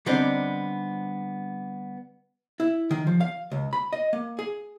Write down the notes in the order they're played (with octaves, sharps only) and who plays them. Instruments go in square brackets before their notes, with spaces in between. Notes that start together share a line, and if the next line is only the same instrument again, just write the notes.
[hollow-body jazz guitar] D3 G3 B3 C4 D4 D#4
E4
D#3
F3
F5
C#2
B5
D#5
A#3
G#4